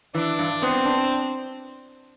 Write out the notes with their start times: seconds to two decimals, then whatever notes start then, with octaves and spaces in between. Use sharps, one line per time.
0.15 E3 D4
0.39 G2
0.62 B3 C4
0.85 D4